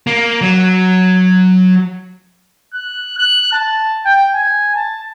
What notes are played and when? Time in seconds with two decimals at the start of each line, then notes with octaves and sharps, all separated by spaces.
0.07 A#3
0.41 F#3
2.74 F#6
3.18 F#6
3.52 A5
4.06 G5
4.34 G#5
4.75 A5